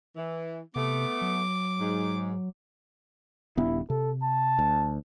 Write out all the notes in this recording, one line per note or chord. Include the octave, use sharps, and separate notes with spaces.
E3
C3 A3 B3 D6
F#3
G#2
D#1 G2 B3 E4
C3 A4
A5
D2